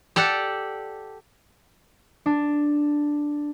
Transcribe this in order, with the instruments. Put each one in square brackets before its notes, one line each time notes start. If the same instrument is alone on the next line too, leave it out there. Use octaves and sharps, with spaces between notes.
[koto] G4 A4 D5 F#5
[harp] D4